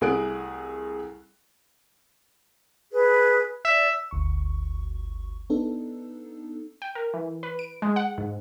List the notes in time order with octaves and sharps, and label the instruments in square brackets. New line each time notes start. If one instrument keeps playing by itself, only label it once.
[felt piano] C2 A3 G#4 F#6 D7
[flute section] G#4 B4
[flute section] D5 [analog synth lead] E5
[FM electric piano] G1 D2 C#6
B3 D4 D#4 A4
[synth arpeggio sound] G5
A#4
E3
B4
D7
G#3
F#5
G#2